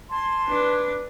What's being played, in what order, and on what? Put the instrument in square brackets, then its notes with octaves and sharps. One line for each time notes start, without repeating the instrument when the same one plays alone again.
[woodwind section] G#5 A5 C6
[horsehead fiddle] D4 B4